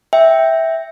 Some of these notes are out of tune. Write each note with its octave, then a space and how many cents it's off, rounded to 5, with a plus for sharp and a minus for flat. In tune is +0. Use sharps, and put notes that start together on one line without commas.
E5 -10 G5 +0